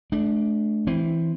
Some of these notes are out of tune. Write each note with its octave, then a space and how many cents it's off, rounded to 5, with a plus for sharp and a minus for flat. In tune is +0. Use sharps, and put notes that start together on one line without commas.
A3 -35 D4 +0
E3 +0 C4 +0